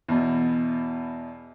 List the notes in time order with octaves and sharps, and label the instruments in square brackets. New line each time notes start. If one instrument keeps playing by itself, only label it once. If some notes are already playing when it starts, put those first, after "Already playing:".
[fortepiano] E2 B2